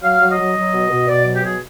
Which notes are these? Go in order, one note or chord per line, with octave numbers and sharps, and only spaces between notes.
F#3 F5
F#3
D#5
F#3
F#3
B2
B2
B2 D5
F#3
G4
B2 G#4